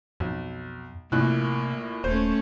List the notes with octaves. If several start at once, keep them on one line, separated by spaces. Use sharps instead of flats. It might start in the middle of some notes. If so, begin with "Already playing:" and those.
B1 F2
A#1 A2 C3 A#3 F#6
D#1 A3 C#4 C5